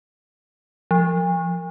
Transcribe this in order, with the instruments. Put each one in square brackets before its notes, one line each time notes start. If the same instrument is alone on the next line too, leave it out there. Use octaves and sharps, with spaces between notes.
[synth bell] F3